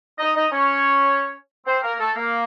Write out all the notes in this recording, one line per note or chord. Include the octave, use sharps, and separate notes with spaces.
D#4 D#5
D#4 D#5
C#4 C#5
C4 C5
A#3 A#4
A3 A4
A#3